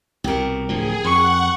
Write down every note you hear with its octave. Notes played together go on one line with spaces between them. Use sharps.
C2 B2 G4 A#4
D1 D3 F3 G#4
F2 F#5 C#6